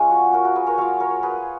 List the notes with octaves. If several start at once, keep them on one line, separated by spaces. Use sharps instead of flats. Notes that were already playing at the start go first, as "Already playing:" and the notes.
Already playing: F3 G#3 C#4 G#4
F#4
F#4 A#4
F#4 A#4
G#4 B4
A#4 C#5
F#3 A#3 F4 C#5 F5
A#4 C#5
G#4 B4